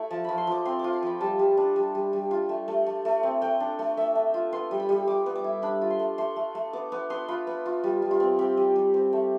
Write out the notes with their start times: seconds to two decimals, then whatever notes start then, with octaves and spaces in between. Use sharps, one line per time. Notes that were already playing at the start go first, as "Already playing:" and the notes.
Already playing: A3 E4
0.10 F3 A5
0.24 F3 B5
0.38 C6
0.47 F3 D6
0.65 C4 C6
0.79 F4 D6
0.93 C6
1.03 F3 B5
1.21 G3 A5
1.39 G3
1.57 D4
1.76 G3
1.95 G3
2.13 G3
2.31 F4
2.49 A3
2.68 A3
2.86 A3
3.05 A3
3.23 C4
3.42 A3 G5
3.60 D4
3.79 A3
3.97 A3 E5
4.15 D4
4.34 F4
4.52 B3 C6
4.71 G3
4.80 B5
4.89 G3
5.07 G3 D6
5.26 B3
5.35 D6
5.44 E4
5.62 D4 B5
5.81 F4
5.90 C6
5.99 A3
6.18 A3 C6
6.36 A3
6.55 A3
6.73 B3 D6
6.92 B3 D6
7.10 B3 C6
7.28 F4 B5
7.47 B3
7.66 F4
7.84 G3 F4
8.02 G3
8.11 F4
8.20 C4
8.39 C4 G4
8.57 G3
8.76 G3
8.94 C4
9.13 A3